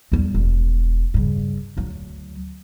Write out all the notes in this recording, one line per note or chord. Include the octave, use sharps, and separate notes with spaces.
E2 G3
E1
G2 C#3
D2 F#3